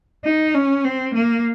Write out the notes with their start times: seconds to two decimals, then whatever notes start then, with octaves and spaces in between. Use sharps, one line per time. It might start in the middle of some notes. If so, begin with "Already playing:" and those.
0.25 D#4
0.55 C#4
0.85 C4
1.15 A#3